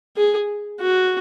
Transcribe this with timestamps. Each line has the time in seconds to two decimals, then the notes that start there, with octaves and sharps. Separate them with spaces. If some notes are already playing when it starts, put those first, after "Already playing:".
0.17 G#4
0.81 F#4